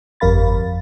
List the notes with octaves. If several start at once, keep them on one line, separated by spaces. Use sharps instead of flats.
G1 F2 A#4 F5 B5 A6